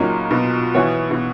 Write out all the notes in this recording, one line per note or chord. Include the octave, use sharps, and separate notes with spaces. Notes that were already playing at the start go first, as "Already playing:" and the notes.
Already playing: F#2 A#2 C#3 F#3 A#3 D#4
B2
E3 B3 F#4 C#5
B2